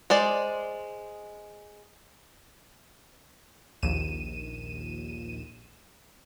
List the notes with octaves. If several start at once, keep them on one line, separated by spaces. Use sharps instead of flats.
G#3 C5 D5
A#1 D#2 D#7 E7